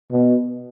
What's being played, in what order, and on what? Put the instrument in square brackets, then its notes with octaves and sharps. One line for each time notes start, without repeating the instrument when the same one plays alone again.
[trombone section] B2